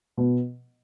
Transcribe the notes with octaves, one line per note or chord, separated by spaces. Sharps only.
B2